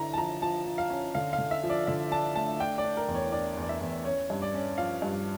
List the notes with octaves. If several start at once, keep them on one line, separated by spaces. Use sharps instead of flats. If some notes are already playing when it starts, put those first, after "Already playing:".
Already playing: D3 E4 A#5
A5
F3 A#5
F3 A5
F3
F5
C#4
D3 F5
F5
D3
E5
F3
D5
D3 E5
D4 A5
A3 A5
D4 G5
D5
D4
A#4
E2
C#5
D4 D5
E2
D5
E5
E2
C#4 C#5
G2
D5
C#4
F3 F5
G2